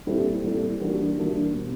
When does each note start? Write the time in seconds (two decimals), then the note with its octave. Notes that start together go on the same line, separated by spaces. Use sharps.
0.07 A#2 G3 C4 E4 A4
0.44 A#2 G3 C4 E4 A4
0.81 E3 G3 A#3 D4 F#4
1.18 E3 G3 A#3 D4 F#4
1.54 B2 G3 C4